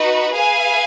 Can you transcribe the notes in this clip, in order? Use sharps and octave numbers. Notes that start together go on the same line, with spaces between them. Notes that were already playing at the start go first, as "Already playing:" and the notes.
Already playing: D#4 F#4 B4
G#4 B4 F5 G#5